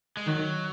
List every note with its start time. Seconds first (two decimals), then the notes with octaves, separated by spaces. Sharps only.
0.17 G#3
0.26 D#3 F#3